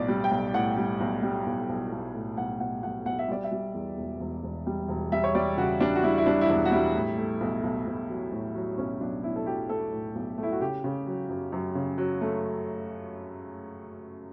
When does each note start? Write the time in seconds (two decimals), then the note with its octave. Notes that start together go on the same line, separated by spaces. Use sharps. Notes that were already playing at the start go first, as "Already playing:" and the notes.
Already playing: B1 A2 D5
0.08 G3
0.24 G5
0.31 B1
0.54 A2 F#5
0.77 G3
1.00 B1
1.23 G3
1.46 B1
1.69 B1
1.92 B1
2.14 A2
2.37 B1 F#5
2.60 B1 F#5
2.83 B1 F#5
3.06 B1 F#5
3.19 E5
3.28 G3 D5
3.44 E5
3.52 G3
3.74 E2
3.97 E1
4.20 E1
4.43 E1
4.67 G3
4.88 E1
5.12 G3 E5
5.24 C#5
5.35 G3 D5
5.58 C#3 F#4
5.80 G3 D4
5.95 F#4
6.03 G3 E4
6.18 E4
6.26 G3 D4
6.41 E4
6.49 E1 D4
6.65 F#4
6.72 G3 E4
6.95 A2
7.17 A3
7.40 B1
7.63 B1
7.87 B1
8.09 F#3
8.32 A2
8.55 F#3
8.78 B1 C#4
9.01 B1 D4
9.23 B1 E4
9.36 A4
9.46 F#3 G4
9.69 A3 A4
9.93 A2
10.15 B1
10.38 A3
10.43 E4
10.52 F#4
10.60 C#3 G4
10.84 C#3
11.07 F#3
11.29 F#2
11.52 F#2
11.75 C#3
11.98 F#3
12.21 A3